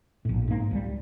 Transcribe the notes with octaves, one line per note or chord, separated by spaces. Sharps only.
A#1 A2
G#2 A#3
C#2 F#3 G3